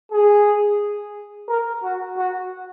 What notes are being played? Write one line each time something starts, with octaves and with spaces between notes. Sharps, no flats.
G#4
A#4
F#4
F#4